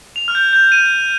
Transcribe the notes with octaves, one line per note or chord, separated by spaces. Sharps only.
F7
F6
G6
G6
D#7